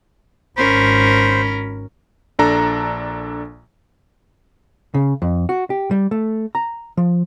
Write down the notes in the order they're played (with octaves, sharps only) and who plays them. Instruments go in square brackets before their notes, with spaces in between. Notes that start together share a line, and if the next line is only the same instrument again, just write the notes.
[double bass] G#1 [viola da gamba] C#4 A#4 [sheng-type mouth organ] C5 [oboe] B5
[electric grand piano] A#1 D4 A4 A#5
[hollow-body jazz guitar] C#3
F2
F#4
G4
G3
A3
A#5
F3